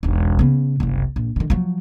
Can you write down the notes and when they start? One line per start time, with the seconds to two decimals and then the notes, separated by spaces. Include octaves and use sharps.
0.03 E1 B1
0.39 C#3 B3
0.80 F#1 C2
1.16 A#1
1.36 D3 D#3
1.50 F3 F#3